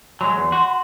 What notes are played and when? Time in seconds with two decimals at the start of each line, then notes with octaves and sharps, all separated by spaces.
0.21 F#3 G#3 C6
0.37 E2
0.52 F#4